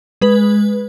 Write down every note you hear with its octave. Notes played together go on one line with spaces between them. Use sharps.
G#3 B4